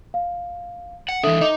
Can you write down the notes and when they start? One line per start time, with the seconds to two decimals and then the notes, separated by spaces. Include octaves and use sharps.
0.14 F5
1.09 F#5
1.23 E3 D4 A4 E5 D#6
1.41 D#4 D#5 D6